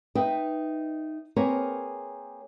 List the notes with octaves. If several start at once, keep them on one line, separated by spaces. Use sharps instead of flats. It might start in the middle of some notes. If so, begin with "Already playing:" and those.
D#4 B4 D#5 E5 G5
A#3 C4 G#4 A#4 B4 C#5